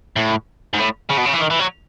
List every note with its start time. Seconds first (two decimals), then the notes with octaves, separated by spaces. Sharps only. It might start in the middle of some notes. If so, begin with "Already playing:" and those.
0.16 A2
0.73 G#2
0.78 A2
1.09 C#3
1.17 B2
1.25 C#3
1.33 E3
1.40 D#3
1.50 E3
1.60 F#3